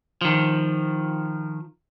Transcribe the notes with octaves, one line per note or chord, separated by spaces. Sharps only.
D#3 F3